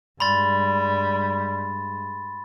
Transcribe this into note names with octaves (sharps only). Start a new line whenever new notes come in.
G2 G3 G#3 B5 C6 A6